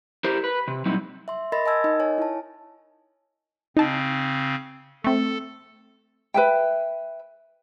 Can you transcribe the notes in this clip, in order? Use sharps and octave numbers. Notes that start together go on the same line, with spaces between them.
E4 G4 A#4 C5
B4
C3
A#2 F#3 G3 C4 D#4 E4
E5 C6
A#4 D#5 B5 C6 A6 A#6
D#5 G#5 A5 E6 G#6
D#4 A#4 D#5
C#5 G#5
E4 A5
C#3 C4 D#4 A5
A3 C4 A4
B4 E5 G5